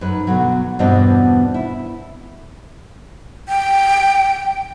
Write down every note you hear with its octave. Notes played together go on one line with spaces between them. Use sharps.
F#2 D#4 B4
B2 D3 F#3
E2 G2 B2 C4 D4 D#5
E4
G5